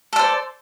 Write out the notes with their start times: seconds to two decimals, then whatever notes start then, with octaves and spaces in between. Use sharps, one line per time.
0.13 A4
0.16 D5
0.19 C5